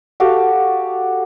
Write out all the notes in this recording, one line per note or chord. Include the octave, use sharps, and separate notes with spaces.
F#4 G4 A4 F5